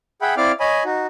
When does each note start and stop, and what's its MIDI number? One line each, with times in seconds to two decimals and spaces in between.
0.22 0.35 68
0.22 0.35 76
0.22 0.35 78
0.22 0.35 79
0.22 0.35 83
0.37 0.52 60
0.37 0.52 64
0.37 0.52 74
0.37 0.52 77
0.37 0.52 86
0.37 0.52 89
0.60 0.83 73
0.60 0.83 75
0.60 0.83 80
0.60 0.83 83
0.85 1.07 63
0.85 1.07 66